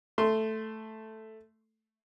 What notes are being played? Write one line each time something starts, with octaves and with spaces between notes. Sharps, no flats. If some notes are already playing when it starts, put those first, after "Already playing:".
A3 C6